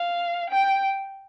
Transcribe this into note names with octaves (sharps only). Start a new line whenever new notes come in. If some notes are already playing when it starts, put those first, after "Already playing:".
Already playing: F5
G5